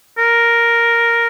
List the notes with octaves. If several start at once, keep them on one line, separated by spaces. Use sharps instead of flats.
A#4